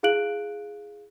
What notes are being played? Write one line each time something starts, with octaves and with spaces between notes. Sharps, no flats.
E4 G#4 F5 F#6 D7 F#7